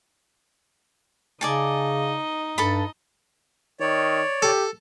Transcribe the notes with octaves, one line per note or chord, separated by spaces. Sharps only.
C#3 D#4 D5 D#5 G#5 A5
G2 A4 A5 B5
D#3 C#5 D5
G4 A4